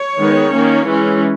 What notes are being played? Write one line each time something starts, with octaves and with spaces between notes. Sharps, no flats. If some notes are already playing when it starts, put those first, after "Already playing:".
Already playing: C#5
D#3 G#3 B3
D#3 A#3 C#4
E3 G#3 C#4